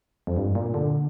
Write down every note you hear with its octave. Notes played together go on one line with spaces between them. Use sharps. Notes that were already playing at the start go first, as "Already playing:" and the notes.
F2
G2
A#2
D3